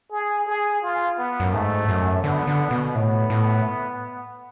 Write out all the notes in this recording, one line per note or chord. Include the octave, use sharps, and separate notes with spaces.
G#4
G#4
F4
B3
F#2
G#2 A3
F#2
D3 B3
D3
B2
A2 B3
A2